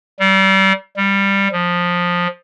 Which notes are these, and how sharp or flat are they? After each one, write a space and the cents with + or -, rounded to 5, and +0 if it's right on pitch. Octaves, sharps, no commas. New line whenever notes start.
G3 -30
G3 +10
F3 +15